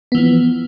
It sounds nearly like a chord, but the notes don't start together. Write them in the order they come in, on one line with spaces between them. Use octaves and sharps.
B3 E3 F3